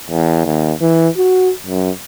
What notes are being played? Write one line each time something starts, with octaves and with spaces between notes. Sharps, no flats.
E2
D#2
E3
F#4
F#2